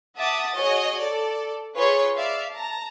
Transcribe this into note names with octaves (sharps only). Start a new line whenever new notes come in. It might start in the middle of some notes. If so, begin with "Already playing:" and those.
E5 F#5 A5 D6 D#6 A6
F#4 G#4 C#5 D#5
A4 D5
F4 G#4 B4 C#5 C6 C#6
D5 E5 F5
A5 A#5